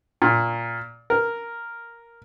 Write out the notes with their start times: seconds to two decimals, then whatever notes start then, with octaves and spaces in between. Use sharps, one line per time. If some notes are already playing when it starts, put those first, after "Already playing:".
0.22 A#2
1.10 A#4